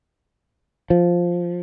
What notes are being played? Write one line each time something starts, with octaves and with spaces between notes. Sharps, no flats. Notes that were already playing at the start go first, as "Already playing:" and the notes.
F3